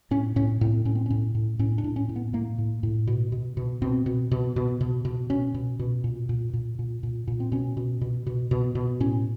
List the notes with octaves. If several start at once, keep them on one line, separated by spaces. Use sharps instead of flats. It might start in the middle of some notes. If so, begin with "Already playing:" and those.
A2 C#4
A2 C#4
A2 C4
A2 C#4
C4
A2 C#4
A2
A2 C#4
D4
A2
C#4
A2
B3
A2 A#3
A2
A2
B2
B2
B2
B2 C4
B2
B2
B2
B2
B2
B2 C#4
B2
B2
A#2
A#2
A#2
A#2
A#2
A#2
C4
B2 C#4
B2
B2
B2
B2
B2
A2 C#4